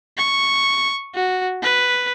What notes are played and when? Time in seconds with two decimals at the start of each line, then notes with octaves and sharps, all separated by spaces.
0.18 C#6
1.15 F#4
1.63 B4